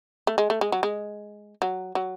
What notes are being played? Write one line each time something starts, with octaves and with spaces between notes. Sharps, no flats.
A3
G#3
A3
G#3
F#3
G#3
F#3
F#3